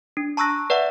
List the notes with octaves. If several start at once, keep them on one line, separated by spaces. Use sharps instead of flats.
D4
A5 A#5 C#6 E6 F#6 A#6
B4 D5 E5 F#5